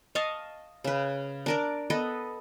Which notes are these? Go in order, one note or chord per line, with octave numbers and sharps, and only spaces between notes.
D#5 F5 A5 C#6
C#3 B4
D4 A#4 D5
B3 A4 B4 D#5